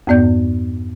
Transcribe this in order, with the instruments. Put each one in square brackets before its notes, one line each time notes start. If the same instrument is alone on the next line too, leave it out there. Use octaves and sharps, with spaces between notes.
[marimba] F2 G#2 B3 D5 G6